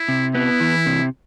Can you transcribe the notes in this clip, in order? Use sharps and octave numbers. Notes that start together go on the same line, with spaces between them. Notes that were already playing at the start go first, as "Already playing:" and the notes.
Already playing: E4
C3
B3 E4
E3
C3